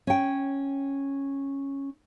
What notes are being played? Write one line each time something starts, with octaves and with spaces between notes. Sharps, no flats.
C#4 G5